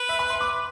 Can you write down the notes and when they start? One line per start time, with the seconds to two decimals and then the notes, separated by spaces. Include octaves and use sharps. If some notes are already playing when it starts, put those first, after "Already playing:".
Already playing: B4
0.09 E5
0.19 B5
0.30 C6
0.41 D6